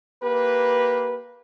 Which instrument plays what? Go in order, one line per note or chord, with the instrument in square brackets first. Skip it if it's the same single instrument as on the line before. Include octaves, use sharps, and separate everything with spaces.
[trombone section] A#3 G4 B4